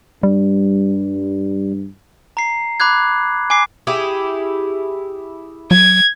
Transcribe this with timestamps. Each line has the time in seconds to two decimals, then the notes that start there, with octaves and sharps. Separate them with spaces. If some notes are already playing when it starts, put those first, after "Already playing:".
0.23 G2 G3
2.37 A#5 C7
2.80 B5 D6 F#6 G#6
3.50 G#5 D6 C7
3.87 E4 G4 G#4
5.71 F#3 G#6